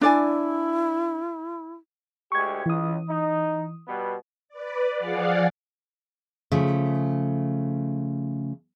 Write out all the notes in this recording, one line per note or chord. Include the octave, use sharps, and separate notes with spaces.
D4 E4 D5 G#5
D2 G#3 G4 C#6 G#6
C#2 E3 D#6
D#4
B2 G3 B3
B4 D5
F3 G#4 D5 F5 F#5
C#3 F3 A3